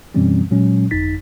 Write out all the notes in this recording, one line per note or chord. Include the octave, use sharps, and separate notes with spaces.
F#2 B2 E3 G3 C4 C#4
A#2 F#3 G#3 C#4
G1 F2 D#4 A6 B6